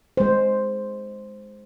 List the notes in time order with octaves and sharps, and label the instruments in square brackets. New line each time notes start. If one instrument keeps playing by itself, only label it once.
[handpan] G#3 C5